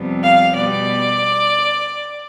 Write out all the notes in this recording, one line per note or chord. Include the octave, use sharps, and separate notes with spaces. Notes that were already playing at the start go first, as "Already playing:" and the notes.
Already playing: F2 C3 G3 B3
F5
B2 G3 B3 D5